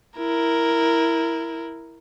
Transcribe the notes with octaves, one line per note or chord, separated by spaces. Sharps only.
E4 A#4